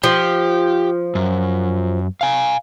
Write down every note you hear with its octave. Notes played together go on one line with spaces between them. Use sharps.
F3 G4
F#2
F5 G#5